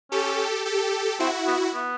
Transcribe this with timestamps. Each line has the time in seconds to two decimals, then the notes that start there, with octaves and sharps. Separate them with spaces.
0.12 C#4 G4 A4
0.66 G4 A4
1.20 C4 E4 F#4
1.47 B3
1.74 B3